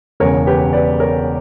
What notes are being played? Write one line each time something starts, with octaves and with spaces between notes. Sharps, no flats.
E1 E2 C#3 A#4 C#5
G4 B4
B4 D5
A#4 C#5